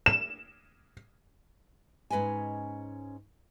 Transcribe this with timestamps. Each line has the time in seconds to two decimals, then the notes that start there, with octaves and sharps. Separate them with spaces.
0.06 E7
2.10 G#2 C#4 B4 D#5 G#5